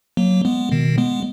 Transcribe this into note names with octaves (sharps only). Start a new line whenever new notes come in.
F#3 A#3
G#3 B3
B2 D#3
G#3 B3